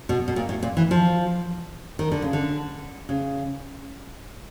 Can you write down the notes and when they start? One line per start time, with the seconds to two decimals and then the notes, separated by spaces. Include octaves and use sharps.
0.09 B2
0.28 B2
0.36 A#2
0.49 A2
0.63 A#2
0.77 E3
0.91 F3
1.99 D#3
2.12 D3
2.22 C#3
2.33 D3
3.09 C#3